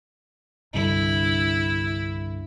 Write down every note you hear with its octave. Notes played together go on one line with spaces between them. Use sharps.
C2 G2 D3 E4